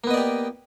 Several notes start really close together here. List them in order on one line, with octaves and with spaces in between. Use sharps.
A#3 B3 D#5 D5 G4